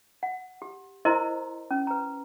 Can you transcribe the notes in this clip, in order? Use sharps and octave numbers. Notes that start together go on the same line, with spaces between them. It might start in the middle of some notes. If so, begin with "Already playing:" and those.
F#5
G4
E4 A#4 C5 D#5 A#5 C6
C#4
B4 A#5